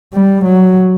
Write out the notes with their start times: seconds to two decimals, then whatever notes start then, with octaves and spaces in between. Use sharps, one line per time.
0.13 G3
0.45 F#3